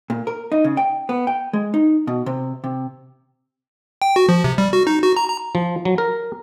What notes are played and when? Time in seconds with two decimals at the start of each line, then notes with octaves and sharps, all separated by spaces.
0.10 A#2
0.27 A#4
0.52 D#4
0.64 C#3
0.77 G5
1.09 B3
1.27 G5
1.53 G#3
1.74 D#4
2.07 B2
2.26 C3
2.64 C3
4.02 G5
4.16 F#4
4.29 F3
4.44 C3
4.58 G3
4.73 F#4
4.87 D#4
5.03 F#4
5.17 A#5
5.28 A#5
5.55 F3
5.85 F#3
5.98 A#4